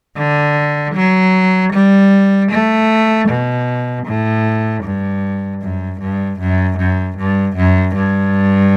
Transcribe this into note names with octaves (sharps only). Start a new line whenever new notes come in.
D3
F#3
G3
A3
B2
A2
G2
F#2
G2
F#2
F#2
G2
F#2
G2